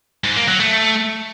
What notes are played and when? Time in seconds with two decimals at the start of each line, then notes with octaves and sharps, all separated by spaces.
0.24 G#2
0.36 A#3
0.48 F#3
0.60 A3